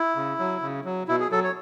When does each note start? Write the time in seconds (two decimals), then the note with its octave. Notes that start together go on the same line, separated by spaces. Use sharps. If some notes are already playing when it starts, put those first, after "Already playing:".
Already playing: E4
0.16 C#3
0.39 F#3
0.62 C#3
0.85 F#3
1.08 B2 E4
1.20 G#4
1.31 F#3 A4
1.44 C#5